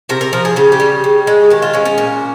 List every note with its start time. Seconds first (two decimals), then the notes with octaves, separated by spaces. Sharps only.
0.09 C3 A#4
0.21 A#4
0.33 F3 A#4
0.45 G#4
0.56 C#3 G4
0.72 G4
0.80 G3
1.04 C#3
1.27 G#3
1.50 D#3 G4
1.62 F4
1.74 G#3 C#4
1.85 C#4
1.98 A#2